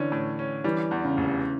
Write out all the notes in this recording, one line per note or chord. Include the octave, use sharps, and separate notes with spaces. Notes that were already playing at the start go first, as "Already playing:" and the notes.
Already playing: D3 E3 C#4
A2
C#4
E3 G3
E2
C#3
F1